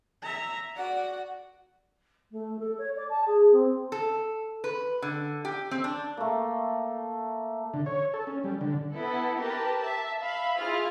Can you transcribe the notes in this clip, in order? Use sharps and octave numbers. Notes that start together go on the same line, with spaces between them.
E5 A#5
F#4 D5 F#5
A3
A4
C#5
D5
A5
G#4
C4
A4
B4
D3
G4
C4
D4
A3 A#3
D3
C#5
A4
C#4
G3
D3
B3 E4 A4
G4 A#4 B4 A5
E5 A5
E5 F5 B5
E4 F4 G#4 F6